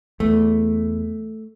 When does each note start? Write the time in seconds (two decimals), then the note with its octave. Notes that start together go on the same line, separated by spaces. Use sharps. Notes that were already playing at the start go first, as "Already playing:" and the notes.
0.20 E2 A3